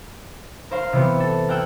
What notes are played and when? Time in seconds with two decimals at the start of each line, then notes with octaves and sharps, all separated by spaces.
0.71 A#4 C5 F5 C6
0.93 C3 E3 B3 G4
1.20 A4
1.48 A#3 F#5 G5 E6 G6